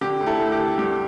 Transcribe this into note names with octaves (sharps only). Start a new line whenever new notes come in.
D3 G4
D2
E4 A4
D2
G4
D2
G2 G4